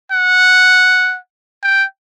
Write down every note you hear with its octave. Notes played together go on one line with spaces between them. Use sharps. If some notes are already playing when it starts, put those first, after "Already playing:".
F#5
G5